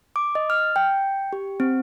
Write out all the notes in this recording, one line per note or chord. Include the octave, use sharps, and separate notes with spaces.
D6
D#5
F6
G5
G4
C4